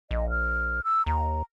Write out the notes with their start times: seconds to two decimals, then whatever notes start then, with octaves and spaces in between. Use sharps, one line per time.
0.11 A#1 D#5
0.30 F6
0.84 E6
1.06 D#2 A#5